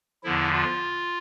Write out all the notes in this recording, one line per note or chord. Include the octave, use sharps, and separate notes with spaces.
E2 D3 F3 E4
F4